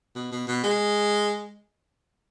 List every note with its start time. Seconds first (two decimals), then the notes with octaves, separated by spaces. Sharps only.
0.15 B2
0.32 B2
0.47 B2
0.63 G#3